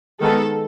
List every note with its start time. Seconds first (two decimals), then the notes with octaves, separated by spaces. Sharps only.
0.21 D#3 G#3 B3 A4